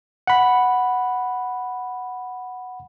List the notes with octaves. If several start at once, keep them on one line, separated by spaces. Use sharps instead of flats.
F#5 B5